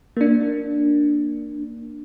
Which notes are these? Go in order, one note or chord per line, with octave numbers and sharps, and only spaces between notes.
A#3 D4